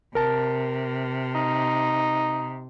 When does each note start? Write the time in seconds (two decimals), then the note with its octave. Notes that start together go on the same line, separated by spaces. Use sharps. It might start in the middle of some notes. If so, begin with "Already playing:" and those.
0.15 C3 A#4 A5
1.35 D#4